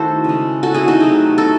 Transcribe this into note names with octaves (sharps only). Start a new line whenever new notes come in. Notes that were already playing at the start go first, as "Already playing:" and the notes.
Already playing: D#3 A3 E4 F#4 A4 C5
C#3 G#3
F#4 A4
E4 G#4
D#4 F#4
C3 F#3 A3
F#4 A4